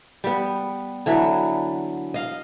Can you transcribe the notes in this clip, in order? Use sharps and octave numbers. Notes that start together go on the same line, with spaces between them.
G3 B3
D3 E3 F#3 B4
D#5 F5